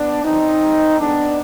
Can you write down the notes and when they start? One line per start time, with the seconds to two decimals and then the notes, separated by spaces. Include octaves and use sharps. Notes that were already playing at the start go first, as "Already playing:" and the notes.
Already playing: B3 D4
0.24 D#2 D3 F3 C4 D#4
0.62 G#2 G3
0.99 F2 D#3 G#3 B3 D4